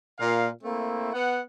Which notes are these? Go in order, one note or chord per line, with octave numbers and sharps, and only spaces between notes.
A#2 F5
A3 A#3 C4 E4
B3 F#5